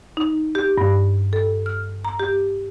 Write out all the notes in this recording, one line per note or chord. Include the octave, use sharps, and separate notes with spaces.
D#4
G4
G2
A4
F6
A#5
G4